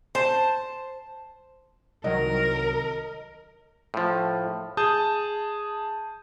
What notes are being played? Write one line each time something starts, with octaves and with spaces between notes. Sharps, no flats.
C5 A5
C2 D#3 F#3 A#4 D#5
A2 F3
G#4 A5 D#6 G6